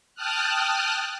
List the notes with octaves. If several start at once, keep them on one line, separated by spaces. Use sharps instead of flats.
G5 A5 D#6 F6 F#6